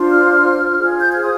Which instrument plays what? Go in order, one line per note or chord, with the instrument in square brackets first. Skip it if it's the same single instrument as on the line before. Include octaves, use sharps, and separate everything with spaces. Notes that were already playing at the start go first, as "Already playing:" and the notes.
Already playing: [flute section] D4 F4 C5
F6
F4 G#4 C5
G6
F6
D#6